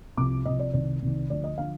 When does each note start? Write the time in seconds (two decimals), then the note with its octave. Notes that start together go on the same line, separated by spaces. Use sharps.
0.17 C2 C3 F3 D6
0.45 C2 C3 F3 D#5
0.59 D5
0.73 C2 C3 D#3 D5
1.02 C2 C3 D#3
1.30 D2 D3 F3 D5
1.44 D#5
1.58 D3 F3 F5